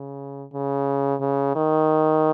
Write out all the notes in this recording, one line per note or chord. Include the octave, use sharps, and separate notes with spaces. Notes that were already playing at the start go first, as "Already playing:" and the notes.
Already playing: C#3
C#3
C#3
D#3